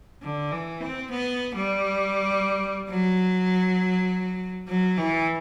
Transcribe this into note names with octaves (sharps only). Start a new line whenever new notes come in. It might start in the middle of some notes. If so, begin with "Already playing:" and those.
D3
E3
C4
B3
G3
F#3
F#3
E3